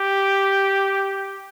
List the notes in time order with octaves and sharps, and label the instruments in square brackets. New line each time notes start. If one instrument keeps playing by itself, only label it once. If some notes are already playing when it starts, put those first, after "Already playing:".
Already playing: [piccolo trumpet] G4